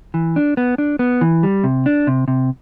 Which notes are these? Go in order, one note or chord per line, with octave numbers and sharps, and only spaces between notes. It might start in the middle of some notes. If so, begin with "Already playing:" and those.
E3
D4
B3
D4
B3
E3
G3
C3
D4
C3
C3